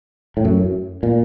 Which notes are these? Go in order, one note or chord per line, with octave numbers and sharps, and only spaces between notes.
A2
F#2
A#2